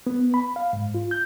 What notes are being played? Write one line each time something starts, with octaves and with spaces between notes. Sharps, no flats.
B3
B5
F5
G#2
F4
G6